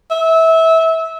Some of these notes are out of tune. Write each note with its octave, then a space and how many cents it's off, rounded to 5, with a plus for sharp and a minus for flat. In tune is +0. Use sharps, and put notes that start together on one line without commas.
E5 -20